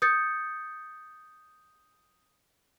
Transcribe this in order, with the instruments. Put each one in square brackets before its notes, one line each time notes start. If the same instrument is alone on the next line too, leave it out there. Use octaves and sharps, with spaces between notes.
[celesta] D#6 G6 A6 C#7